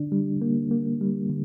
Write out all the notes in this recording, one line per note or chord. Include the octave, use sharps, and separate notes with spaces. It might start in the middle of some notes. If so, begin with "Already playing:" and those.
Already playing: D3 D4
G3
A#3
A#3
G3
D3